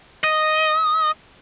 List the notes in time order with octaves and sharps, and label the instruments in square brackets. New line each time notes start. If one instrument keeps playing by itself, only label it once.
[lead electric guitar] D#5